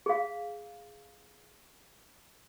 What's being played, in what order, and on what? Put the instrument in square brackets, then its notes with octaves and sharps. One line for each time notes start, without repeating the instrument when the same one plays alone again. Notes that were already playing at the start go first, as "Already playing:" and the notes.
[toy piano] G#4 F5